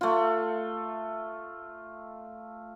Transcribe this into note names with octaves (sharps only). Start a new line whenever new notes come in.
A3 F4